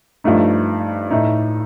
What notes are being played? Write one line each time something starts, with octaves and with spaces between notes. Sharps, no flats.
G2 F3 A3 D#4
A2 A3 D#4